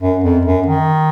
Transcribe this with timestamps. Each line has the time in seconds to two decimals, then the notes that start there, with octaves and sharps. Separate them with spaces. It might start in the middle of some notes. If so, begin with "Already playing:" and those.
0.02 F#2
0.24 F2
0.46 F#2
0.67 D#3